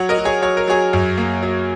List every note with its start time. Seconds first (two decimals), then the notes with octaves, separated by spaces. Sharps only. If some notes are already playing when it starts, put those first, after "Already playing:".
Already playing: F#3 C#5 F#5
0.09 A#4 D#5
0.18 F#3
0.25 G#4 C#5
0.42 F#3 C#5
0.57 A#4
0.67 F#3 G#4 C#5
0.93 F#2
1.18 A#3
1.43 F#3